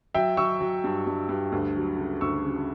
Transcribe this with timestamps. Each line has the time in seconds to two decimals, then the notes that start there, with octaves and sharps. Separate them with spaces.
0.14 F#3 E5 G5
0.37 F#3 C#6 E6
0.61 F#3
0.84 G2
1.07 G2
1.29 G2
1.52 D2
1.76 F#3
1.98 C#3
2.21 D2 C#6 E6
2.44 C#3